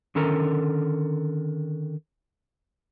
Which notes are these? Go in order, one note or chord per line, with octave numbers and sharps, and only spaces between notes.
D3 D#3 C#4 A4 A#4 A#5